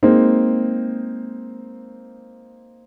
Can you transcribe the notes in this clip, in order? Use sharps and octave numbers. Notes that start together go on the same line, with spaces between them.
G#3 A#3 C4 D#4